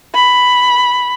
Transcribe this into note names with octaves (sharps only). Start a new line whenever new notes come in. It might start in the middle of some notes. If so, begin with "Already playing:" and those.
B5